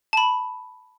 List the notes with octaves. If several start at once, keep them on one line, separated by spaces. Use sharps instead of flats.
A5 B5